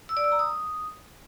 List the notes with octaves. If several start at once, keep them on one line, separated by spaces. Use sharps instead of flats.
E6
D5
E6
A#5
D#6